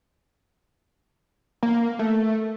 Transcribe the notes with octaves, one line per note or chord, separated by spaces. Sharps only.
A#3
A3